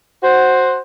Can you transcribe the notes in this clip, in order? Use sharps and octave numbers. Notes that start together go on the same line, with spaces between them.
F#4 C5